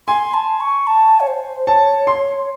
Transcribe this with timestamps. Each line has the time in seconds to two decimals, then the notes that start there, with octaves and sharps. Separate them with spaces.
0.07 G#5 C6
0.34 A5
0.60 C#6
0.87 A5
1.20 C#5
1.27 C5
1.67 C#5 A5
2.07 C6